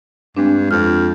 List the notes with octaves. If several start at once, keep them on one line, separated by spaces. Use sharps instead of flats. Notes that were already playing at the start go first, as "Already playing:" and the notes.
G2 G#3 C4 D4
F2 F6